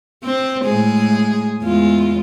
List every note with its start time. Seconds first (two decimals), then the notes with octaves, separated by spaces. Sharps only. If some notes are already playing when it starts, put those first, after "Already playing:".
0.24 C4 C5
0.64 A2 G#3 G#4
1.62 E2 G#3 F4